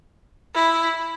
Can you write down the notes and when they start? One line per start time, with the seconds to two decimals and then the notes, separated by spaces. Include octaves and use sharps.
0.55 E4